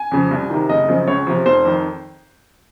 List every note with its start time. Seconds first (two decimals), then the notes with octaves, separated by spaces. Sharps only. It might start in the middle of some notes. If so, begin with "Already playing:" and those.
Already playing: G#5
0.11 F2 C#3 F3
0.31 C2
0.50 C3 D#3
0.69 F#1 D#5
0.89 F#2 C#3 F3
1.08 C#2 C#5
1.27 C3 F3
1.46 F1 C5
1.65 F2 D#3